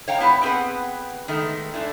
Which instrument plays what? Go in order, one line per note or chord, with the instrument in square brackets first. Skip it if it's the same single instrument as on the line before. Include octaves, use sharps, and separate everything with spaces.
[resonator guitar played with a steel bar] C#5 F5 G5 A#5
B3 E4 G4 B4
B3 C4 G#4 B4 F#5
D#3 G#3 A3 B3
G#3 A3 D4 E4